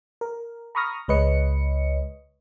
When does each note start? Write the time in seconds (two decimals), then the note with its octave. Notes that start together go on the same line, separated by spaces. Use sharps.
0.21 A#4
0.75 A#5 B5 C#6 D#6 F6 A#6
1.08 C#2 G#3 B4 C#5 D#5 C#7